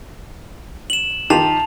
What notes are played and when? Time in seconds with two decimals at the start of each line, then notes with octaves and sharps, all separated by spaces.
0.90 E7 F#7
1.30 D#3 F4 G4 A5 F7